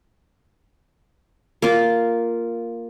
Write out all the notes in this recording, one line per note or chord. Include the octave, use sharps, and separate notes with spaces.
A#3 F4